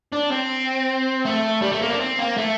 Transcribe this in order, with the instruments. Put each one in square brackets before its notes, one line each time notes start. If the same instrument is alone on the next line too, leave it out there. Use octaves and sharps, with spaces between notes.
[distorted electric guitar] D4
C4
A3
G3
A3
A#3
D4
C4
A#3
A3